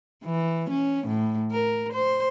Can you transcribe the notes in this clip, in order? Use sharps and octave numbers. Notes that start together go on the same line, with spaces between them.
E3
C#4
A2
A#4
C5